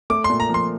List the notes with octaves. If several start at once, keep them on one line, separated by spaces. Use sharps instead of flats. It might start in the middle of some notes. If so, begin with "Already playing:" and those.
A3 D6
C6
A#2
A#5
F3 C6